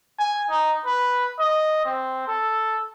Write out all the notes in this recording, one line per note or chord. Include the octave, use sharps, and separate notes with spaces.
G#5
D#4
B4
D#5
C4
A4